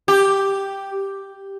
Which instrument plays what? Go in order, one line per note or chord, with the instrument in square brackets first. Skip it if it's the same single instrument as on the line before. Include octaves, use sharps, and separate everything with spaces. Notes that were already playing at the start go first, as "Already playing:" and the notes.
[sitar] G4